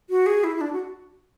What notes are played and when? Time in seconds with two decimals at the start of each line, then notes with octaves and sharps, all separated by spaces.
0.10 F#4
0.26 G#4
0.44 E4
0.56 E4
0.61 D4
0.73 F#4